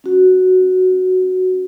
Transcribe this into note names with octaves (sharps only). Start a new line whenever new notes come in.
C#4 F#4